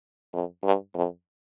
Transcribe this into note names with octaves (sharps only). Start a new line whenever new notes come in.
F2
G2
F2